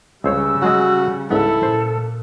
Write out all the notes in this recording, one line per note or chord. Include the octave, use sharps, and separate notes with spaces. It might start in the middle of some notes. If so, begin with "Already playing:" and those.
C#2 C#3 G3 C5 C#5 E6
F#3 G#3 F#4 D#5
C#2 G#2 B3 E4 A4
A#2 C5